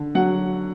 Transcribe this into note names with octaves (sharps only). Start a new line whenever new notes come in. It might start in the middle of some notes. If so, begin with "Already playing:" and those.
Already playing: D3
F#3 F#5